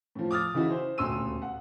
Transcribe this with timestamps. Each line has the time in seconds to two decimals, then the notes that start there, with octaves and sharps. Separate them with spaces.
0.15 A2 F3
0.31 D6 D#6 F6 A6
0.54 C#3 E3 D#4 E4 F#4
0.70 C5
0.98 D#1 D2 B2 C6 E6 D#7
1.42 F#5